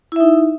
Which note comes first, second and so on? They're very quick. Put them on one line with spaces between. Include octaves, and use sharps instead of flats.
E4 E5 D#4